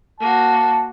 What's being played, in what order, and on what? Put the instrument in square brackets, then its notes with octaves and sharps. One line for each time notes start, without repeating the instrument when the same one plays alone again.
[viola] A#3 F#4 [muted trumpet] A5